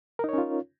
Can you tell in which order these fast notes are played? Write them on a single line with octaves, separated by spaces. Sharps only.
A#4 D#4 C#5 C#4 F4